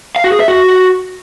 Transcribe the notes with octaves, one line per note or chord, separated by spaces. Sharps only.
F5
F#4
G#4
E5
F#4